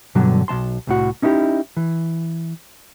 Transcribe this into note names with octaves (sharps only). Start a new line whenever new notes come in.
G2 B2 D3 F#3 G3
B1 G#3 A5 C6
C2 A2 F#4
C#4 D#4 E4 F#4 G4
E3